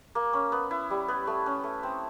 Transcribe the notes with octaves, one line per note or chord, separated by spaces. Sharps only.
A#3
C#4
B3
E4
G3
B3
A3
C#4
A3
C4